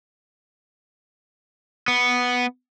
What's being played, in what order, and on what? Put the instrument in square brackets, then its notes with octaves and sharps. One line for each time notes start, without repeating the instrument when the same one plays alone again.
[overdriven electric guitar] B3